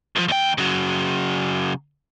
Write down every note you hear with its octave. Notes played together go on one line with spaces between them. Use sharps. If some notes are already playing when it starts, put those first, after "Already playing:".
F#2 F3
D#2 G5
C#3 F#3